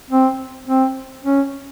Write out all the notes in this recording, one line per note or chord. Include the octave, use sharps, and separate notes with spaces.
C4
C4
C#4